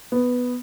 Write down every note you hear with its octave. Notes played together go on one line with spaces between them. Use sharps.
B3